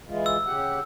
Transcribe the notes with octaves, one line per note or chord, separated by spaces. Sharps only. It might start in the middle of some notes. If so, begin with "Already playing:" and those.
E3 G#3 F4
E6
C#3 G4 F#5